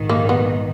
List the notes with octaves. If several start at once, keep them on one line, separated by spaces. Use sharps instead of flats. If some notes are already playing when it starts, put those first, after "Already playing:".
Already playing: A#1 G#2 D#3
A#3
B3